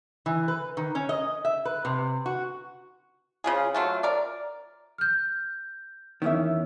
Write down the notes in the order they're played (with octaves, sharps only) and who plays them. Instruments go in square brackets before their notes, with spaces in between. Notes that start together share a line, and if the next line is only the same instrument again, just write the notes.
[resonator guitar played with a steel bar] E3
B4
D#3
C#4
D#5
E5
B4
C3
F#4
[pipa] C#3 F4 G#4
F#3 A3 F4
A#4 D5
[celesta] F6 G6
[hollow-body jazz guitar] E2 D#3 [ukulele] C#4 E4 E5